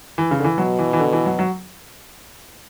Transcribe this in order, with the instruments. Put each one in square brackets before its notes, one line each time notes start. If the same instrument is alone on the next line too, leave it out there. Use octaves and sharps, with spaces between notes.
[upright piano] E3
C#3
D3
E3
[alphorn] B2 [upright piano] F#3
[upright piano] E3
E3
D3
E3
F#3
F#3